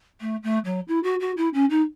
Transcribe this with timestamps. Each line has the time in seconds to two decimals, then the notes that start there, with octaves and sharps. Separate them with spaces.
0.21 A3
0.43 A3
0.65 F#3
0.88 E4
1.03 F#4
1.20 F#4
1.37 E4
1.54 C#4
1.70 D#4